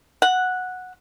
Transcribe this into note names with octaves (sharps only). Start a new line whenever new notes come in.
F#5